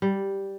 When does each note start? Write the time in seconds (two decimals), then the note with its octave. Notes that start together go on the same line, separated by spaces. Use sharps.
0.02 G3